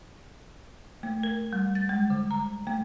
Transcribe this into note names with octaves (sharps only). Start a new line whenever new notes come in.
A3
A#4
G3
A6
G#3
D3
A#5
A3